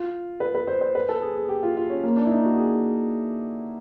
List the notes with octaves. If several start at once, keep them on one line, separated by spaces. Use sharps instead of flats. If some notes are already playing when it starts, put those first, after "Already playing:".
Already playing: F4
B4
B4
C5
C5
B4
A4
G#4
G#4
G4
F4
F4
C#4
A#3
D4
E4
D#4
F#4
G#4